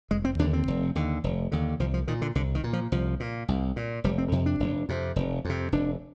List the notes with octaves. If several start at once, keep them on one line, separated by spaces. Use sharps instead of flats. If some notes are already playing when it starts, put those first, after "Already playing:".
F1 G#3
C4
D#2 D3 D4
C4
F1
D#2 D3
F1
D#2 D3
C2 F3
F3
A#2 D#3
D3
C2 D3
D#3
A#2
F3
C2 F3
A#2
C2
A#2
F1 G3
C4
F2 C3
D4
F1
F2 C3
F1
F2 C3
F1 D4